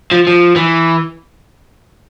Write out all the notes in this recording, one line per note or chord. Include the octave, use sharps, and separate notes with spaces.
F3
F3
E3